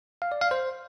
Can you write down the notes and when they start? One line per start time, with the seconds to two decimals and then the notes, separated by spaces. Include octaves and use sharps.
0.22 F5
0.32 D5
0.41 F5
0.51 C5